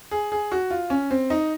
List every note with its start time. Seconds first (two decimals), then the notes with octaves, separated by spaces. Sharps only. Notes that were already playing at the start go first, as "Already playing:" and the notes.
0.11 G#4
0.32 G#4
0.52 F#4
0.70 F4
0.90 C#4
1.11 C4
1.30 D#4